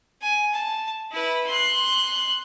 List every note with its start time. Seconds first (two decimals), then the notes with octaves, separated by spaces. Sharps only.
0.22 G#5
0.54 A5
1.12 E4 B4
1.47 C6 F#6